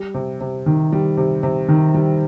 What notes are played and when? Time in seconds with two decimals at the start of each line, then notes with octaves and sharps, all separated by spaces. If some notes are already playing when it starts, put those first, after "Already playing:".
Already playing: G3
0.14 C3
0.41 C3
0.66 D#3
0.92 G3
1.17 C3
1.43 C3
1.69 D#3
1.94 G3